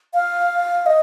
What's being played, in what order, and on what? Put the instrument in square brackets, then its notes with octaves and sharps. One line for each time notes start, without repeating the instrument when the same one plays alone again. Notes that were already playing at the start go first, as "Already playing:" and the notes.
[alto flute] F5
D#5